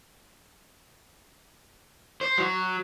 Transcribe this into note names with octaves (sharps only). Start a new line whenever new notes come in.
C5
F#3